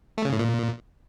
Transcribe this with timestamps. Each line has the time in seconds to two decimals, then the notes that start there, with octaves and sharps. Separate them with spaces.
0.18 A3
0.25 C#3
0.32 A2
0.40 A#2